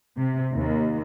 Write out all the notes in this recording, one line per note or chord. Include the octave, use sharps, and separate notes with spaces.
C3
D#2